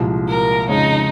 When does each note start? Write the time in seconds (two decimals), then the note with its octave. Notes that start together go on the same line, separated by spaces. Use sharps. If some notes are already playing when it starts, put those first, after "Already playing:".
Already playing: C2 A#2 F3 G#3
0.26 A#4
0.68 F2 C#3 G#3 C#4 D#4